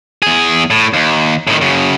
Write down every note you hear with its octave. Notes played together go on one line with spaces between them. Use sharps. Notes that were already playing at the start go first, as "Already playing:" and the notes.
E2 G#4
A2
D#2
A2 D#3
F#2 C#3